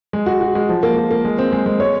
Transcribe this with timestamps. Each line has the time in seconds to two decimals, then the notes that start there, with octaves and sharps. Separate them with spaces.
0.13 G#3
0.26 F#4
0.41 F#4
0.55 G#3
0.69 F3
0.83 A#3
0.97 A#3
1.11 A#3
1.25 G#3
1.38 C4
1.52 G#3
1.66 G#3
1.80 C#5